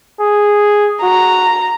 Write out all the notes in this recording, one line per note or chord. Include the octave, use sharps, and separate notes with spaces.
G#4
F#4 A#5